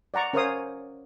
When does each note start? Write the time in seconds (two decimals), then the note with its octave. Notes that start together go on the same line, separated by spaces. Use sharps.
0.14 D5 F#5 A#5 C#6
0.33 C#4 A#4 C5 C#5 F5 D#6